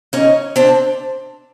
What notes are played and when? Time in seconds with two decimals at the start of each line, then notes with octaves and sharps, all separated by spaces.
0.13 C#4 D#4
0.56 C4 D4